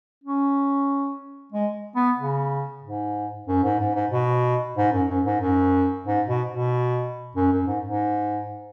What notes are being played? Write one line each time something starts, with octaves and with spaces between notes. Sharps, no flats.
C#4
G#3
B3
C#3
G#2
F#2
G#2
G#2
G#2
B2
G#2
F#2
F#2
G#2
F#2
G#2
B2
B2
F#2
F#2
G#2
G#2